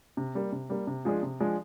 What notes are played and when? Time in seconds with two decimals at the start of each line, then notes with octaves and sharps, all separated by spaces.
0.17 C3
0.35 G3 A#3
0.52 C3
0.70 G3 A#3
0.87 C3
1.05 F3 G#3 D4 G#4
1.23 C3
1.40 F3 G#3 D4 G#4